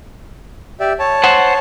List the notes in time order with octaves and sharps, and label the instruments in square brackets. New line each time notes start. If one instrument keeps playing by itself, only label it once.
[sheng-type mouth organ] G4 D5 E5
C#5 A5
[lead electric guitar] C5 F#5